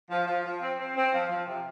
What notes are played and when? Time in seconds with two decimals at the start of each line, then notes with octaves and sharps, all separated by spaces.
0.10 F3
0.27 F3
0.45 F3
0.62 C4
0.78 C4
0.96 C4
1.13 F3
1.29 F3
1.47 C3